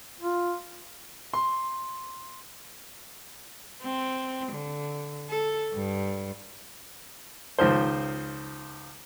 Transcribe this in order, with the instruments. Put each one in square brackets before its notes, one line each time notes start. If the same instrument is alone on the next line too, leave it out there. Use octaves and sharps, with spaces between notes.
[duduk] F4
[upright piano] C6
[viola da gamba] C4
D3
A4
G2
[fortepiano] C#2 D#3 F3 C5